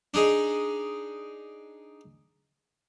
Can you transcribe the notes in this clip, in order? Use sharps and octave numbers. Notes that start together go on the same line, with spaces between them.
D4 D#4 G#4